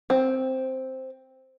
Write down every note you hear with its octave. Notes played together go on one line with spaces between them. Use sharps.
C4